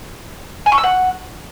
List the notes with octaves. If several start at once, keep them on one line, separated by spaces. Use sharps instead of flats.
G#5
C#6
E6
F#5